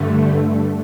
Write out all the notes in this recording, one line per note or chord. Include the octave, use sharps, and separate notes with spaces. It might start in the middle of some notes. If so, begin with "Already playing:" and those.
Already playing: G2 D3 A3